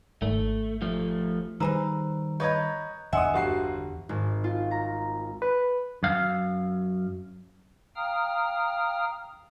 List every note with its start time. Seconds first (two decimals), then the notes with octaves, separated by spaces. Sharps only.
0.22 G#1 A3
0.82 F3 A3
1.60 D#3 G3 D#4 G#4 B4 C5 A#5 E6
2.40 B4 C#5 D#5 A#5 G6 G#6
3.13 E2 D3 D#5 E5 F#5 G#5 C6 D#6
3.34 G1 F#4 G4 C7
4.09 G#1
4.44 F4
4.71 A#5
5.42 B4
6.03 F#2 F5
7.96 F5 G5 A#5 D#6 F6